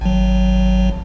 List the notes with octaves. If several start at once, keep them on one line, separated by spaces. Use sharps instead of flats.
G#1 F#3